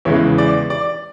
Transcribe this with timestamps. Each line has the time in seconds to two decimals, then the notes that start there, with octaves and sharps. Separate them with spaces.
0.05 E2 C#3 E3 G#3 B3 C#5
0.38 D5
0.70 D5